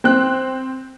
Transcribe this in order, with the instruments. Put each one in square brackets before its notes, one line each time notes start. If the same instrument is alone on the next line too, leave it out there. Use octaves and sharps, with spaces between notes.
[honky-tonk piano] C4 F#6